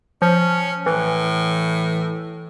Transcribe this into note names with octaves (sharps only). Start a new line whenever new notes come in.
F3 C#4
A2 E3